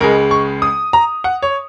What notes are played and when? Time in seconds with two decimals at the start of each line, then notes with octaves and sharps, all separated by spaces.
0.01 C#2 C#3 G#3 A#4
0.31 C#6
0.62 D#6
0.93 A#5
1.24 F#5
1.42 C#5